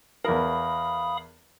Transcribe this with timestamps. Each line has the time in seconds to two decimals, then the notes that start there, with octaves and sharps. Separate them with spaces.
0.25 E2 A#4 F5 B5 D#6